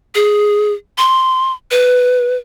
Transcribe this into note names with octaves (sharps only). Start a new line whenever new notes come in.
G#4
C6
B4